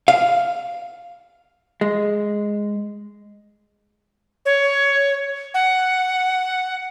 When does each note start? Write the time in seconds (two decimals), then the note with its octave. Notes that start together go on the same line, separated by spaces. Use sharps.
0.08 F5
1.81 G#3
4.46 C#5
5.54 F#5